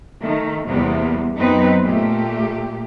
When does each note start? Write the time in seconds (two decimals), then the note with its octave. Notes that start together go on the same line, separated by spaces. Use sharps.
0.22 D#3 A3
0.67 E2 C3 G3 A#3 B3
1.36 F#2 B3 C4 D#4 B4
1.82 A#2 A3 G4